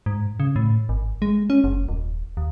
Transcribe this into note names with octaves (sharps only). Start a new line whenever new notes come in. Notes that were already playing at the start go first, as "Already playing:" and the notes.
G#2
C#3
A2
G#1
G#3
C#4
F#1
D#1
D#2